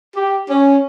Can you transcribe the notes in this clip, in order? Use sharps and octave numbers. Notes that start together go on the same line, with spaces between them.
G4
C#4